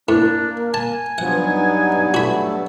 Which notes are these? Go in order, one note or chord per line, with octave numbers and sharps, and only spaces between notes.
A2 A#3 D4
G#5 A5
G2 F3 F#3 B3 F#5
D#4
A3 F#4 B5